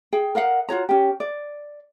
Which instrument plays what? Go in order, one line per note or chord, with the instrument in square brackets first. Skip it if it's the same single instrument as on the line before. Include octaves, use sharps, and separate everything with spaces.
[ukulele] G#4 G5
A#4 D#5 F5 F#5
F4 F#4 C#5 A#5
C#4 G4
D5